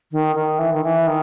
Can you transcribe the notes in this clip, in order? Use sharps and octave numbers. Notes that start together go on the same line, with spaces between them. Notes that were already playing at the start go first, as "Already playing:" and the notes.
D#3
D#3
E3
D#3
E3
D#3